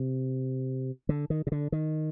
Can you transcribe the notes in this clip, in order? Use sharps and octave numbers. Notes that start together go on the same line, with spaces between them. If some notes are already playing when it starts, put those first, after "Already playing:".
Already playing: C3
D3
D#3
C3
D3
D#3